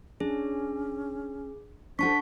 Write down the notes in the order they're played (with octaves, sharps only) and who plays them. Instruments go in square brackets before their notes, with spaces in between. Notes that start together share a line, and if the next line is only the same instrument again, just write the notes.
[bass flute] C#4 [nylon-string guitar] D4 [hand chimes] G#4
[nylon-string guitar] D4 A4 [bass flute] C5 [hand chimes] F#5 A5 C#6 [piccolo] B6